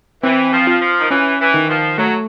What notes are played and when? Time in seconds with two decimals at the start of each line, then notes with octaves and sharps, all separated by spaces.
0.23 E3 C4
0.52 F3
0.67 F4
0.81 F3
1.00 D#3
1.10 E3 C#4
1.40 E3
1.54 D#3
1.69 F3
1.98 F#3 A3